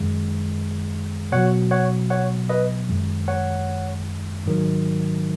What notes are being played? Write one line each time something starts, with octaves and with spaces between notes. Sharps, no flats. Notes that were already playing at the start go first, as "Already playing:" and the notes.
Already playing: F#2 D#3 G#3
B2 F#3 C#5 F#5
C#5 F#5
C#5 F#5
B4 D#5
F#2 D#3 G#3
C#5 F#5
G#2 D#3 F#3